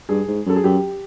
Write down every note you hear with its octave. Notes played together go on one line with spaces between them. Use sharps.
G2 G#4
G#2
F#2 A4
G#4
F#2 G4